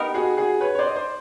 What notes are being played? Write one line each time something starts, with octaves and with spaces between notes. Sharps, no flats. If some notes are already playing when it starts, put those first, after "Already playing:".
Already playing: B3 D#4 G4 A#4
F#4 G#4
F#4 G#4
B4 C#5
C#5
C5 D5
D#5
C5 D5